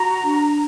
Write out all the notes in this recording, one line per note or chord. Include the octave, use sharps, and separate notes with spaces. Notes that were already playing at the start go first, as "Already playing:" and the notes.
Already playing: F#4 A#5
D4